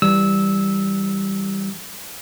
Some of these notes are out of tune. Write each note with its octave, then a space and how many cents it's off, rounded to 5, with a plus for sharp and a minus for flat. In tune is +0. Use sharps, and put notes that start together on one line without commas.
E3 +0 G3 +0 E6 -15